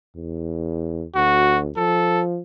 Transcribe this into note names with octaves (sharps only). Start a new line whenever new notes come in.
E2
D2 F#4
F3 A4